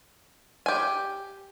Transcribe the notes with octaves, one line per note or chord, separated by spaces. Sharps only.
G4 G#5